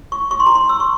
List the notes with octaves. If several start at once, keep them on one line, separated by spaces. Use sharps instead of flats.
C#6
C#6
C6
A#5
C6
E6
C#6